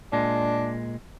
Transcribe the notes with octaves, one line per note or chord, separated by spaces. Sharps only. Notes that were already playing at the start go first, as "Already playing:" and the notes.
A#2 G#3 D4